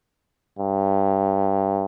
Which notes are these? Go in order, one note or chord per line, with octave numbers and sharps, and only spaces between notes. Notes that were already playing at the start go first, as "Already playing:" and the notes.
G2